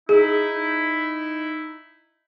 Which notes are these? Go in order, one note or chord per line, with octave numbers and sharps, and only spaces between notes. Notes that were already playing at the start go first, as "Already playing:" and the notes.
D#4 E4 G#4